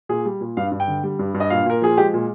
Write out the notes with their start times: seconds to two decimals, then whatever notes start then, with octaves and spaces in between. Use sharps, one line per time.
0.09 A#2 G#4
0.25 G3
0.41 A#2
0.57 G2 F5
0.71 G2
0.80 G5
0.88 D3
1.03 G3
1.19 G2
1.34 G2
1.40 D#5
1.50 A#2 F5
1.66 A#2 A#4
1.82 F3 G#4
1.97 G#3 G4
2.14 A#2